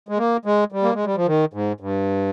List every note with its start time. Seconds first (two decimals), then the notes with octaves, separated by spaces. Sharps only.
0.09 G#3
0.18 A#3
0.45 G#3
0.72 G3
0.83 A#3
0.94 G#3
1.05 G3
1.16 F3
1.26 D#3
1.53 G#2
1.80 G2